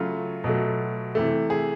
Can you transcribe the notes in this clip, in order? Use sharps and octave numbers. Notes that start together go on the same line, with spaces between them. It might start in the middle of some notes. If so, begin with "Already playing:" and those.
Already playing: C#3 F#3 A3 F4
B2 F#3 A3
C3 E3 A3
G#4